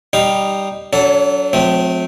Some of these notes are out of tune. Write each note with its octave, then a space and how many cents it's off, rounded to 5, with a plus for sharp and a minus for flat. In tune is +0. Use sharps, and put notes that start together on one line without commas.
G3 +0 D#4 -10 F5 +0
F#3 +0 D4 -45 A4 +0
F3 +45 A3 -35 C4 -15